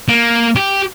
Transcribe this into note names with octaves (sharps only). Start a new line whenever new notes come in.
A#3
G4